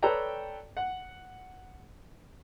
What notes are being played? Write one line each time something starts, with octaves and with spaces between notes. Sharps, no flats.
A4 B4 C#5 D5 G5 A#5
F#5